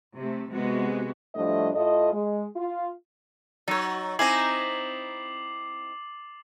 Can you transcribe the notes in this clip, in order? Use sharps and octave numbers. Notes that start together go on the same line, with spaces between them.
C3 A3
C3 G#3 B3 F#4
A2 F3 G3 A3 D4 D#5
A2 F4 A4 D#5
G#3
F4
F#3 D#4 C#5 A6
C4 D#4 E4 G#5 A#5 D6 C7 F#7